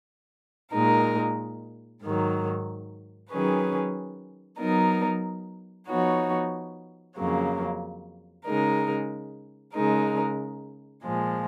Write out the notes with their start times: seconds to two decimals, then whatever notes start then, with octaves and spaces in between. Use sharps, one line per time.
0.73 A#2 G#3 D#4 A#4
2.02 G#2 D#3 F#3
3.31 D#3 F#3 C#4 G#4 B4
4.59 F#3 B3 D#4 A#4
5.88 F3 B3 D#4 F#4 C#5
7.17 F2 C#3 F#3 A#3
8.46 C#3 G#3 D#4 A#4
9.75 C#3 G#3 D#4 A#4
11.03 A#2 F3 G#3